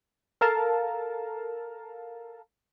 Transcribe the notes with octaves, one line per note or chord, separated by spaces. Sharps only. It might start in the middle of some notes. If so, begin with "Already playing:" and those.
A4 A#4 F5 A5